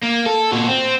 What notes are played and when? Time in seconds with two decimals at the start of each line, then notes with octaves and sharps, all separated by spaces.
0.03 A#3
0.26 A4
0.52 A#2 F#4
0.68 C4